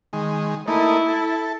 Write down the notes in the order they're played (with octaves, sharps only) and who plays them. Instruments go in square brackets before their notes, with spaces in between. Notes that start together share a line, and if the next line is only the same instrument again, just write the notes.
[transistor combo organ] D#3 G#3
[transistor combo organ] A3 A#3 D#4 [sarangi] E4
[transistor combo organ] A4